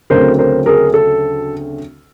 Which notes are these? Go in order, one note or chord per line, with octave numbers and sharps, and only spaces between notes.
D2 C#3 F#3 A3 C4 A#4 C5
A#4 C5
G#4 A#4
A4